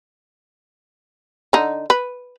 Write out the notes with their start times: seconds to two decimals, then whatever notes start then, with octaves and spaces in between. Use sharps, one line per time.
1.53 D3 D#4
1.90 B4